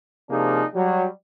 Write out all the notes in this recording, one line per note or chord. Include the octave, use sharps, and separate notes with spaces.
C3 F3 A#3 D4 D#4 G#4
F#3 G3